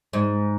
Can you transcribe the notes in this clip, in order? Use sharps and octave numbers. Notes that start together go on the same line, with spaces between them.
G#2